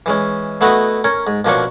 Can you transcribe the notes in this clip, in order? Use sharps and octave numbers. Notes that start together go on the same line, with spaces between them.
E3 G#3 C#4
A3 B3 E4 F#4 D#5
C#4 A#4 C#5
G#2
B2 F3 A#3 C#4 D4 C#6